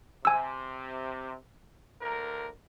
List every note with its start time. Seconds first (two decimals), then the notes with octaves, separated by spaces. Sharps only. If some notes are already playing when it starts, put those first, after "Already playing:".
0.25 C3 G#5 E6
2.01 D2 A#4